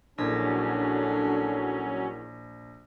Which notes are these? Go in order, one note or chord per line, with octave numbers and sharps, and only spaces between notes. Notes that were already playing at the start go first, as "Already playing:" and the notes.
A#1 D3 F#3 C#4 D4 E4 G#4 A#4